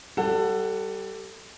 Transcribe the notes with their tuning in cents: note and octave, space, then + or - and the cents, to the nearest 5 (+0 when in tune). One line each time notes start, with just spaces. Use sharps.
G3 -10 A4 +20 F#5 +0